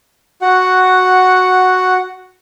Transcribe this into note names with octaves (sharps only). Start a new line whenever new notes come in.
F#4 F#5